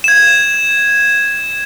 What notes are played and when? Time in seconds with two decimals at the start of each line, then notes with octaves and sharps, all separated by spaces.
0.04 G#6 E7